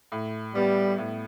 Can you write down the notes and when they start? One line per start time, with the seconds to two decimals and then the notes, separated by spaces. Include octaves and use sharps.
0.12 A2
0.55 G3 B3
0.98 A2